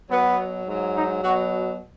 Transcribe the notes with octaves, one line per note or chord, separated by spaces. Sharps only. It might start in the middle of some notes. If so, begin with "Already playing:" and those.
B2 F#3 B3
G#2 F#3
D#4
B2 F#3 F#4